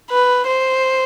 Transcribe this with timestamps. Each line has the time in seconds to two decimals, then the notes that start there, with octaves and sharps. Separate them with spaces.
0.10 B4
0.46 C5